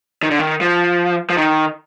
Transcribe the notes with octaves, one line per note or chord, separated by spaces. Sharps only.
D#3
D3
D#3
F3
F3
D#3